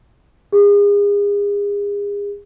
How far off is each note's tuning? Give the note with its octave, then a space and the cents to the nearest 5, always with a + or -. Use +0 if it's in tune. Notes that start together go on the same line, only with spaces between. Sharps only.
G#4 -35